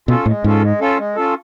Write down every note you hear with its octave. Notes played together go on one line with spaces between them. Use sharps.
B2 C#4 F4 A4
A2 G#3
G#2 C#4 F4 A4
G#3
C#4 F4 A4
G#3
C#4 F4 A4